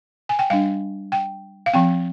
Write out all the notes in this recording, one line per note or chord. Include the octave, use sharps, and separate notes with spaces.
G#5
G5
G3 D4 F5
G5
F5
F3 C4 G5